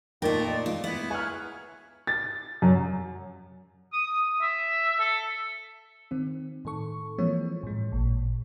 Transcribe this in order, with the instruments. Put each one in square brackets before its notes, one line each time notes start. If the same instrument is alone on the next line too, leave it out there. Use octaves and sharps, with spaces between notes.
[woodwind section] F2 A#2 D5 [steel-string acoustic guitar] A3 A#4 [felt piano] A#3 D#4 G5
[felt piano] D#5
[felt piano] G#3 [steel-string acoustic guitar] F4
[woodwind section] B3 [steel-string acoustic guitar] E4
[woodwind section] G#4 B4 C#5 [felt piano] G#5 F6
[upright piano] A6
F#2
[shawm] D#6
E5
A4
[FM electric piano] D#3 C4
A2 D#3 A4 C#6
E3 F3 G#3 A#3 C4 C#5
A2 G#3
A1 A#2